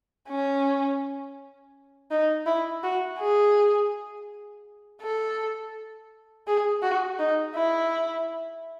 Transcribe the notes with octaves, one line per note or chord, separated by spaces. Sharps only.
C#4
D#4
E4
F#4
G#4
A4
G#4
F#4
D#4
E4